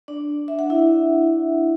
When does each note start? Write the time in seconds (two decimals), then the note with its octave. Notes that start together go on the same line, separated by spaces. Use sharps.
0.08 D4 D5
0.48 E5
0.59 F#5
0.70 E4 E5